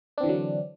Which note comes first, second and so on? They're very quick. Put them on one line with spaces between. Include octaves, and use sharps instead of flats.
D4 C4 E3 D3 F#3